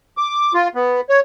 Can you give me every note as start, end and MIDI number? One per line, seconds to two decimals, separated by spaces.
0.17 0.53 86
0.54 0.68 65
0.75 1.01 59
1.09 1.20 73